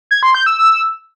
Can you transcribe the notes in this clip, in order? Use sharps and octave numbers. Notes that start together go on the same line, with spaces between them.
G#6
C6
G6
E6
E6